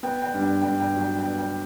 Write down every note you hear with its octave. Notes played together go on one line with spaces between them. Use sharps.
B3 G5
G5
G2
G5
G2 G5
G5
F#3 G5
G5
B3
G5